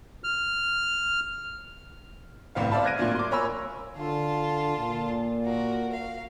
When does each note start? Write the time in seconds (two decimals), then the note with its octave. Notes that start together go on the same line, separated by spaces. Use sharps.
0.24 F6
2.55 G1 C2 A2 C4 B4 F5
2.71 C5 D5 E5 F5 A5 B5
2.84 F6 F#6 G#6 A#6 D7 D#7
2.98 A#2 F#3 A3 D4 F4
3.15 C6 D6
3.31 A#4 C#5 G#5 A#5 B5 E6
3.97 D3 F4 A5
4.77 A#2
5.45 F#4 A#4
5.92 F5